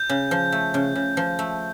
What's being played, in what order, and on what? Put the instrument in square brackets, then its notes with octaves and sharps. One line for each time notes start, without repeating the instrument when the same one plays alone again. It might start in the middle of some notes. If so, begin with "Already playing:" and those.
Already playing: [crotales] G6
[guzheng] C#3
F3
A3
C#3
C#3
F3
A3